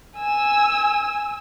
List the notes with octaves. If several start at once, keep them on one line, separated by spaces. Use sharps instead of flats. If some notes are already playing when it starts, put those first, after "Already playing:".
G#5 E6